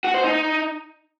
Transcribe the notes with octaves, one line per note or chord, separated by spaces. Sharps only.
F#4
C5
D#4